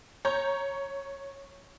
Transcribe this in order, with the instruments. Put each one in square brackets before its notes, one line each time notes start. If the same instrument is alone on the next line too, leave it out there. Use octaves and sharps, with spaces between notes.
[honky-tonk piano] C#5 A#5 C#6 G6